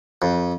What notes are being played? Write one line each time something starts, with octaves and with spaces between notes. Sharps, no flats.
F2